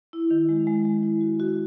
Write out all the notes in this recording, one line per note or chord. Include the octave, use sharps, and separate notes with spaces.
E4
D#3
G#3
G#3
G#3
E4
F#4
F#4